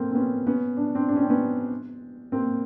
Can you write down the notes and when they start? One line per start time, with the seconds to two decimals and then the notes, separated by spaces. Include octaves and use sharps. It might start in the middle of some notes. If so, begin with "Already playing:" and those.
Already playing: A3 A#3 C4
0.11 C4
0.15 B3 C#4
0.47 B3 C#4
0.77 D4
0.95 C4 D4
1.09 D4
1.16 C#4
1.22 C4
1.30 B3 C#4
2.32 A#3 C4